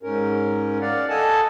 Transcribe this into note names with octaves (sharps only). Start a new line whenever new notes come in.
G#2 C#4 A#4
D5 F5 F#5
A4 D#5 F#5 G#5 A5